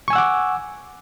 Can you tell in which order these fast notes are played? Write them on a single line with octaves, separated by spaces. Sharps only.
C#6 G#5 E6 F#5 D6